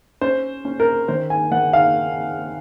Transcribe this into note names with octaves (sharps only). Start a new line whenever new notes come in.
C#4 C5
C#4
A#4
D#3 C5
G#5
D#3 F#5
F5